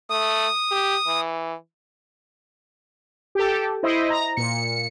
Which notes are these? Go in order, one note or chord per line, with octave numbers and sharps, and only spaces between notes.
A3 D#6
G4
E3
G4 A4
E4 C5 D#5
A#5
A#2 C#7